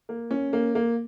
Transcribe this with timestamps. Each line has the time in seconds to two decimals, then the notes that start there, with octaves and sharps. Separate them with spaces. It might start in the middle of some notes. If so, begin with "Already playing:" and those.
0.09 A#3
0.31 C#4
0.53 A#3
0.75 A#3